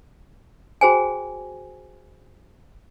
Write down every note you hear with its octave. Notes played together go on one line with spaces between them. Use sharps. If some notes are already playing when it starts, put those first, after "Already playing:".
F#4 G#4 C5 G5 G#5